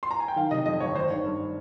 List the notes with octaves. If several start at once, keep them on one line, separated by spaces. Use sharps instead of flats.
C6
A#5
G#5
G5
D#3 F5
C3 D#5
F2 D#5
G1 C#5
G#1 C5
D#3 C#5
G2